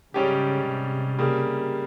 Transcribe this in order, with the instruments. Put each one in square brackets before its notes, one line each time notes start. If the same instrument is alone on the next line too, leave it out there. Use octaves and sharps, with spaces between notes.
[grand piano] G#2 G3 C#4 G4 [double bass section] C#3
[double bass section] C3
[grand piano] C#3 G3 A#3